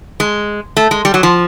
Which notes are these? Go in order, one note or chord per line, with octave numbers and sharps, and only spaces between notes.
G#3
A3
G#3
G3
F#3
F3